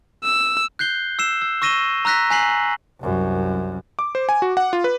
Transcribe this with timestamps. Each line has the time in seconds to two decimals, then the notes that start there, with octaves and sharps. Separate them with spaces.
0.24 E6
0.79 F#6 G6 C7 G7
1.19 E6 C7 E7
1.42 E6
1.62 C#6 E6 A#6 D#7 E7 G7
2.05 A#5 E6 F#6 A#6 B6
2.30 G#5 A#5 F#6 B6 C7 F#7
3.01 C2 F#2
3.99 D6
4.15 C5
4.29 G#5
4.42 F#4
4.57 F#5
4.73 F4
4.84 B4